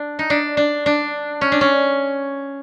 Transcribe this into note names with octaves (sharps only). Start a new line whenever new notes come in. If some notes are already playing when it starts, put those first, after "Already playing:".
Already playing: D4
D#4
D4
D4
D4
C#4
D4
C#4